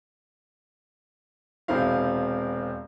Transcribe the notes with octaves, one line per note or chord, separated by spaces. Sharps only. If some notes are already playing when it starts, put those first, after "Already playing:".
E1 C3 C4 E4 F5